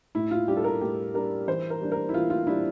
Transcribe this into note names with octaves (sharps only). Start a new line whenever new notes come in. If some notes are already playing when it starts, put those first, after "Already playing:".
A2 E4
F4
G3 D4 G4
A4
A#4
A2 G4
G3 D4 A#4
E3 C5
A#4
G3 D4
A#4
E4
E3 F4
F4
G3 D4 E4